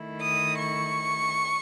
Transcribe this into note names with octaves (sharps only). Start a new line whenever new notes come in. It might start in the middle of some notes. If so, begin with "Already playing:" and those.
Already playing: D#3 A3 E4
D#6
C#6